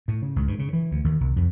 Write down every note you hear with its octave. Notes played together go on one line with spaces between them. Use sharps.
A2
C#3
C#2
G2
C#3
E3
D2
D#2
C2
F2